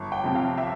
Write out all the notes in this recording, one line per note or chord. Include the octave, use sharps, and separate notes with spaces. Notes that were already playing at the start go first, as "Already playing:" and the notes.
Already playing: G1
G5
F2 C3
F5
E5